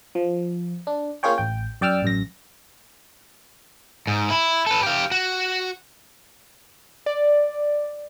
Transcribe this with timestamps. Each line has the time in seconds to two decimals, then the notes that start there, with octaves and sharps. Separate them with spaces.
0.15 F3
0.87 D4
1.23 A#3 C#4 F4 G#4 C#5 G5
1.38 A1 G5
1.81 F#2 D5 G5 D6 E6 F6
2.02 A1 F#2 A#6
4.07 G#2
4.30 E4
4.67 A4 B4
4.83 G4 F5
5.11 F#4
7.06 D5